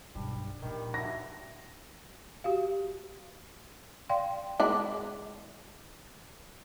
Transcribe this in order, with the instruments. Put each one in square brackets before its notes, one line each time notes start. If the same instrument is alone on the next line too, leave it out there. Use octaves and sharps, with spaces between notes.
[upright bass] B1 G2 [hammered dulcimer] G3 D4
[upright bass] A#2 F3 [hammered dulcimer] D#3 G3
[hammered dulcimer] F#3 D4 E4 [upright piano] A#6
[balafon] F#4 G4 F5
D5 F5 G5 C6
[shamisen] G#3 E4 D5